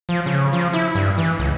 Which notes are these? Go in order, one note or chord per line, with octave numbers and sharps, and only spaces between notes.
F3
C#3
F3
E4
G2
E3
C#2